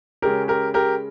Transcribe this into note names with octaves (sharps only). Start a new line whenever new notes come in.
C#3 G#3 C#4 G4 A#4
G4 A#4
G4 A#4